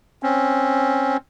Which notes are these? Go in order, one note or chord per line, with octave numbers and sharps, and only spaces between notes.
C4 C#4